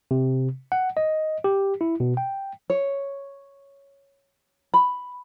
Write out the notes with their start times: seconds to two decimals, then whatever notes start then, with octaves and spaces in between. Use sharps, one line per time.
0.11 C3
0.72 F#5
0.97 D#5
1.44 G4
1.81 E4
2.00 B2
2.17 G5
2.70 C#5
4.74 B5